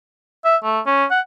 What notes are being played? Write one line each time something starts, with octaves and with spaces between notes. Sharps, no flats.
E5
A3
C#4
F#5